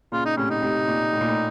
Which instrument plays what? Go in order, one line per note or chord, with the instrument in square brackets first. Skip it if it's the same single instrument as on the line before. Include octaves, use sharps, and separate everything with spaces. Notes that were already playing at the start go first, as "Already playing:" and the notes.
[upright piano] A#2 C#3 [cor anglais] F4
[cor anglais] D#4
[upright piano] A2 C3 [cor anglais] C#4
[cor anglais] D#4
[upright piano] A2 C3
A#2
A2
A#2
A2